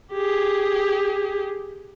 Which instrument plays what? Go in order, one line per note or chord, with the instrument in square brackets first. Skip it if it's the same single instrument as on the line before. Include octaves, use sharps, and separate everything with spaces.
[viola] G4 G#4